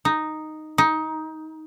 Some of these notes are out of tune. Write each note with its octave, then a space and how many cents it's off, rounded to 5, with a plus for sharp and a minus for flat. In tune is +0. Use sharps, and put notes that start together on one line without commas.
D#4 -5
D#4 +15